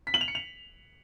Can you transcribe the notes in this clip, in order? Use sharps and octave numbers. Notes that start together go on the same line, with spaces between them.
B6
F#7
F7
C#7
F7